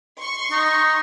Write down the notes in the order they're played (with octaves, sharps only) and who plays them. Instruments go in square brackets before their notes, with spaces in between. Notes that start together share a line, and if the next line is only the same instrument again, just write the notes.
[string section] C6 C#6
[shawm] D#4